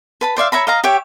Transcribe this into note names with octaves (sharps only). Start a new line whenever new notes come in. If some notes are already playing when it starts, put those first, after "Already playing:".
B4 A5 B5
C5 D5 E5 F5
C#5 E5 A#5 B5
D#5 F5 A#5
G4 C#5 E5 G5